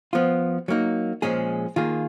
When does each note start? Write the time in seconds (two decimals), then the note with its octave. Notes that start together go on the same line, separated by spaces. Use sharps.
0.13 F3 B3 F4
0.68 F#3 A#3 D#4
1.22 A#2 F3 G#3 C#4 G#4
1.76 D#3 A#3 F4 G#4